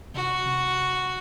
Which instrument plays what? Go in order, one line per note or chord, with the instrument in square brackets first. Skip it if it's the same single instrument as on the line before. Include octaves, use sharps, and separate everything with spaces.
[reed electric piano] C3 [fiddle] F#4
[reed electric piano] C3
D2